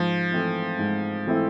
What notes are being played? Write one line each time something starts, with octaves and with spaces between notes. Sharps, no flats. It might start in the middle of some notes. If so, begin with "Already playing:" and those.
Already playing: G#2 F3
E3 A3 C4 E4
G#2
E3 A3 C4 E4